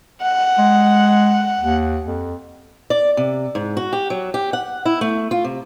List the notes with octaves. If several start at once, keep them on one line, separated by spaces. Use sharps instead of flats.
F#5
G#3
D#2
F2
D5
C3
G#2
F#4
G4
F#3
G4
F#5
E4
A3
F4
C3